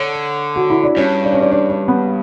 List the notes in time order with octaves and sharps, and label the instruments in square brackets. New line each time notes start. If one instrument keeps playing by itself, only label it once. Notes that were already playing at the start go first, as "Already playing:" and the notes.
Already playing: [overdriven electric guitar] D3 [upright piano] C#5
[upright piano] F#4
E4
D4
[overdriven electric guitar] G2 [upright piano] C#4
[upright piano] D4
C#4
D4
D4
D4
B3